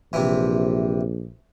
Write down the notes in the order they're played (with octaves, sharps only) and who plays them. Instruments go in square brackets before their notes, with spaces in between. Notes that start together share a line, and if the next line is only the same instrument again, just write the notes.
[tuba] A#1 [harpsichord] C3 E3